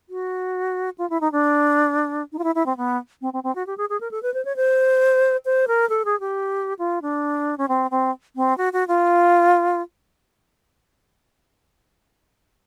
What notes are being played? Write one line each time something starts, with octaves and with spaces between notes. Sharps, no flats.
F#4
F4
E4
D#4
D4
D#4
F4
E4
E4
C4
B3
C4
C4
C4
F#4
G4
G#4
G#4
A#4
A4
B4
C5
C#5
C5
C5
A#4
A4
G#4
G4
F4
D4
C#4
C4
C4
C4
F#4
F#4
F4